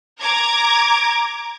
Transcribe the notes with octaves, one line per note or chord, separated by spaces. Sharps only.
A#5 D6 G#6